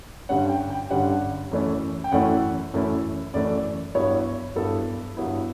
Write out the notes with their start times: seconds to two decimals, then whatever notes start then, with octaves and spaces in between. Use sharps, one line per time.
0.29 G2 D3 G3 C#4 F#5
0.49 G5
0.70 G5
0.90 G2 D3 G3 C#4 F#5
1.51 F#2 E3 A3 C#4 E4
2.04 G5
2.12 F#2 E3 A3 C#4 E4 F#5
2.74 F#2 E3 A3 C#4 E4
3.34 F#2 E3 A3 C#4 E4 D5
3.95 G2 F#3 B3 E4 C#5
4.56 G2 F#3 B3 E4 A4
5.17 G2 F#3 B3 E4